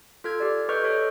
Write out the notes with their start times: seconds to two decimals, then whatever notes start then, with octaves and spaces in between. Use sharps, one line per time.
0.24 F4 A4 F6 G#6
0.40 G4 D5
0.69 A4 B4 D#5 C#6 F6 G6
0.84 A4 C#5 D#5